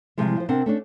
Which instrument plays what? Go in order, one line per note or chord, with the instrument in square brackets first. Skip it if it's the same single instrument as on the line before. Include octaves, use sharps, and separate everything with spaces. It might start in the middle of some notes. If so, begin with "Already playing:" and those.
[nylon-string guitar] C3 E3 F3 G3 G#3
F3 C5
C3 C4 D4 A#4 F#5
A3 C#4 D4